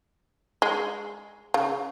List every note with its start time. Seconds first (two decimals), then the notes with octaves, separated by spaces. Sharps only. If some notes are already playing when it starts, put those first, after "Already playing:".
0.62 G#3
1.54 C#3